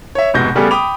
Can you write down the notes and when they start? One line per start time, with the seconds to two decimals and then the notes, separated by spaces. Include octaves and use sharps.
0.15 C#5 E5
0.34 F1 G#2 B2 G6 A#6
0.55 C#3 G3 A3 B3 G4 G#4
0.71 G5 B5 D6 D#6 F7